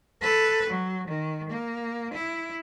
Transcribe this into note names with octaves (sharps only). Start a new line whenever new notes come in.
A4 B4
F#3
D#3
A#3
E4